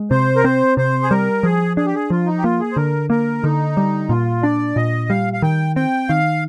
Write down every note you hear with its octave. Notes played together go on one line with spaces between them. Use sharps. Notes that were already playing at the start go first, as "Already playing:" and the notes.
Already playing: G#3
C3 C5
A#4
C4 C5
C3 C5
G#4
G3 A#4
F3 G#4
D4 G#4
G4
G#4
F3 F4
D#4
G4
A#3 F4
G#4
C5
D3 A#4
A#3 A#4
D3 D#4
G3
A#2 F4
D4 D5
A#2 D#5
G3 F5
F5
D#3 G5
C4 G5
D#3 F5